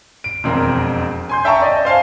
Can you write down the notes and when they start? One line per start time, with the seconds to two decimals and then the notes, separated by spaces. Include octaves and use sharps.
0.24 D7
0.44 E1 F2 C4 A#4
1.29 G#5 C6 G6
1.45 E5 G5 A5 A#5 C#6
1.62 D5 D#5
1.85 C5 F5 G#5 A5